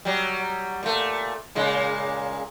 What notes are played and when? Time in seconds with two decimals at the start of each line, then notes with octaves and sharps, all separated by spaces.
0.05 F#3 G3
0.83 A#2 A3
1.55 A#2 C#3 G#3